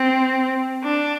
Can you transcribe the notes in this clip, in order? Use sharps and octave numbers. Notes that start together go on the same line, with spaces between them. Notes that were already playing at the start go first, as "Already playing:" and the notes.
Already playing: C4
D4